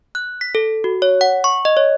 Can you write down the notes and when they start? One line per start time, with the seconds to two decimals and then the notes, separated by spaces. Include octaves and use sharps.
0.15 F#6
0.41 B6
0.55 A4
0.84 F#4
1.02 C#5
1.21 F#5
1.44 C#6
1.65 D#5
1.77 C#5